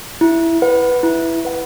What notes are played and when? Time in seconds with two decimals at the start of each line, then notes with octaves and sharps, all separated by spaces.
0.21 E4
0.62 B4 F#5
1.03 E4
1.45 B4 F#5